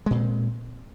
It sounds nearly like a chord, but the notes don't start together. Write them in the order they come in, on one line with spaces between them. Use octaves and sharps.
G#3 A#2 C4